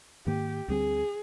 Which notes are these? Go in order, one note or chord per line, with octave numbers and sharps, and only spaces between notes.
G#2 D#3 A#3 G4
D2 D3 G3 C4 G#4